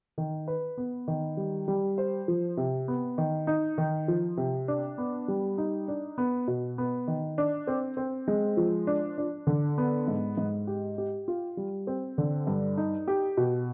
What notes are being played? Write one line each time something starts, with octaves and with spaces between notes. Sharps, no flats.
D#3
B4
B3
D#3
G3
G3
C5
F3
C3
B3
D#3
D#4
D#3
F3
C3
D4
B3
G3
D#4
D4
B3
B2
B3
D#3
D4
C4
C4
G#3
F3
D4
D4
D3
B3
G#2
G#2
G4
G4
F4
G3
C4
D3
G2
D#4
G4
B2